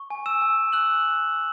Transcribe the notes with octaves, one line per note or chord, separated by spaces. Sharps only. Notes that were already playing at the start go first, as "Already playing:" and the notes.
Already playing: C#6
G#5
E6 E7
G#5
E6 F#6 F#7